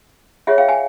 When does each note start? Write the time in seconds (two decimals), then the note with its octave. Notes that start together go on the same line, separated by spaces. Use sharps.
0.47 F4 G#4 C#5 E5 F#5
0.58 F5 G5
0.68 F#5 G#5